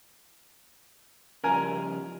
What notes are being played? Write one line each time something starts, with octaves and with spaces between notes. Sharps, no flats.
C#3 F3 G3 A#4 G#5 A#5